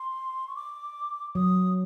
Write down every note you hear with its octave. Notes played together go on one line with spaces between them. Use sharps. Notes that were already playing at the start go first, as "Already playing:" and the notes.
Already playing: C6
C#6
D6
F#3 D#6